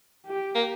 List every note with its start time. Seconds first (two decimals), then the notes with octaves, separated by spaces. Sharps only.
0.26 G4
0.55 A#3